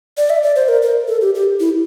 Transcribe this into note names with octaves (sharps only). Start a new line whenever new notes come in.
D5
E5
D5
C5
A#4
A#4
A4
G4
G4
E4